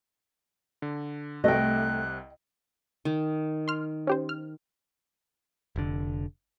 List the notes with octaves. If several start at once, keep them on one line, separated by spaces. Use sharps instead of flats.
D3
C2 C3 A3 D#5 G5 F#6
D#3
C6 F6
C#4 G4 C5
F6
F1 D3